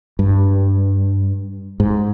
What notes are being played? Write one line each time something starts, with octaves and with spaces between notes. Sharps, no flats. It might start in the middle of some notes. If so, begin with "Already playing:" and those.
G2
G#2